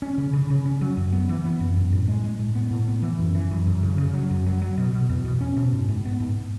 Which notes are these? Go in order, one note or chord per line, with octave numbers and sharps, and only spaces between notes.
C#4
C#3
C#3
C#3
C#4
F#3
F#2
B3
E3
B3
F#2
F#2
A2
G#3
G#3
A2
B3
A2
B3
E3
F#2
E3
F#2
F#2
C#3
C#3
F#3
F#2
F#3
F#3
B2
B2
E2
B2
C#4
B2
G#2
G#2
B3
G#2